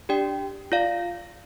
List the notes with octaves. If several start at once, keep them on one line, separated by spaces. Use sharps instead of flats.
D4 G4 D5 G5
F4 D5 F5